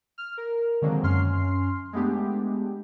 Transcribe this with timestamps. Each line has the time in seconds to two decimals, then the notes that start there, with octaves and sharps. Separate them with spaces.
0.18 F6
0.37 A#4
0.82 D3 D#3 F#3 G#3 A#3 C4
1.03 F#2 C#4 C6 F6 C7
1.93 G#3 A3 B3 D4 G4